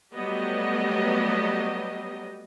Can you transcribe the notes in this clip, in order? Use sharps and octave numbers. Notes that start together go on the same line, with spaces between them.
F#3 G3 A3 B3 G4 D#5